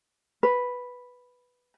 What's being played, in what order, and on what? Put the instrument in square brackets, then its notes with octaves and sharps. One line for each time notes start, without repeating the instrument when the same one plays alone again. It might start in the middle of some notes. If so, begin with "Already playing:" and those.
[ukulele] B4